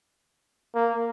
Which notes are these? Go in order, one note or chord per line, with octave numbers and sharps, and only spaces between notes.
A#3